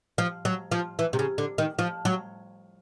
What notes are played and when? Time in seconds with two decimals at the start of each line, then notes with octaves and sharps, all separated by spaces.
0.18 F3
0.45 F#3
0.71 F3
0.99 E3
1.13 C3
1.19 C#3
1.38 D3
1.58 D#3
1.79 F3
2.05 F#3